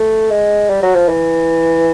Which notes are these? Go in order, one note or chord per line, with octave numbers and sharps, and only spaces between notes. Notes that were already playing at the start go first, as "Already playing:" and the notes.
Already playing: A3
G#3
G3
F#3
F3
E3